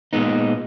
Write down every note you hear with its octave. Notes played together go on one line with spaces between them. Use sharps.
A#2 G#3 B3 D#4